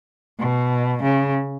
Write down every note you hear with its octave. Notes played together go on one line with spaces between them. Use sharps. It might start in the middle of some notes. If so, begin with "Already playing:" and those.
B2
C#3